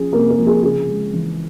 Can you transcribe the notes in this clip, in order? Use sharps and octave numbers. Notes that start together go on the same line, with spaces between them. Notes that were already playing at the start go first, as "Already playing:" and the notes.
Already playing: F3 C#4 G#4
C3 A#3 A#4
A#3 A#4
F3
G#4
C#3 G#4
G#3
E3